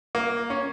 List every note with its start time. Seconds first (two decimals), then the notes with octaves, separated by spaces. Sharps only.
0.15 A#3
0.50 C#4